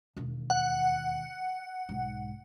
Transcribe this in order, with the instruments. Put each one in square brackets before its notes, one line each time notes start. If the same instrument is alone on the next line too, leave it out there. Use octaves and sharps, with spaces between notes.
[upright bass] E1 D#2
[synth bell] F#5
[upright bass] B1 G#2